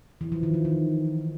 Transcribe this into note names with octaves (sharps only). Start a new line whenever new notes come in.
E3
F3
D#3
D#3
D#3